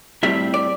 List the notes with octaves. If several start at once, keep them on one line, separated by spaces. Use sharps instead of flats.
A2 G3 C4 E5
D5